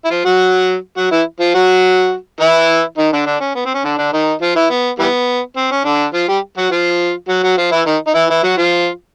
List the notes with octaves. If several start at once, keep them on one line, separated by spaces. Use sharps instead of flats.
E4
F3 F4
F#3 F#4
F#3 F#4
E3 E4
F3 F4
F#3 F#4
E3 E4
D#3 D#4
D3 D4
D3 D4
C#4
B3
C4
C#4
D3 D4
D3 D4
D#3 D#4
F3 F4
E3 E4
B3
E3 G3 B3
C4
C#4
D3 D4
F3 F4
G3 G4
F#3 F#4
F3 F4
F#3 F#4
F#3 F#4
F3 F4
E3 E4
D#3 D#4
D#4
E3 E4
E3 E4
F#3 F#4
F3 F4